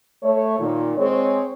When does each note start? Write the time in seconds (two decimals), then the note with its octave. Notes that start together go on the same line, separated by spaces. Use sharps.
0.23 A3 C#5
0.59 A#2 D#3
0.96 G#3 C4 G#4 C#5